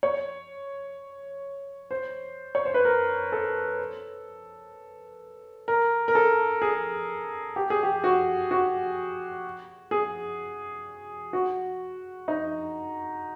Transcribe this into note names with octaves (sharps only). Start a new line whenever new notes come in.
C#5
C5
C#5
C5
B4
A#4
A4
A#4
A#4
A4
G#4
G4
G#4
G4
F#4
F#4
G#4
F#4
D#4